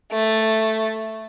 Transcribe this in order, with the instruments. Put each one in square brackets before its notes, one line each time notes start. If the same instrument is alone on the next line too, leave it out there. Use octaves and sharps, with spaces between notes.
[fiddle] A3